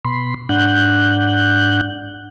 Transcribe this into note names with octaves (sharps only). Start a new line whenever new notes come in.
B2 B5 C6
G#2 D4 F#5 F#6 G6